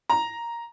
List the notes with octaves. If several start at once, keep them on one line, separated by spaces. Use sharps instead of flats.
A#5